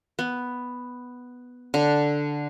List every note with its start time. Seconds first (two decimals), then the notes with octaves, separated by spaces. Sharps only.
0.19 B3
1.74 D3